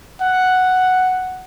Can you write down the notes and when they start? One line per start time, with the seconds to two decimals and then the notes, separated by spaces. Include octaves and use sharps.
0.22 F#5